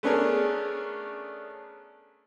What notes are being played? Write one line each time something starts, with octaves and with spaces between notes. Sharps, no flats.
A3 B3 C#4 D4 G#4 A#4